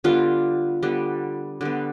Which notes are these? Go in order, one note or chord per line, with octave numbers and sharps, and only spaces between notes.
D3 G3 B3 F4
D3 G3 B3
D3 G3 B3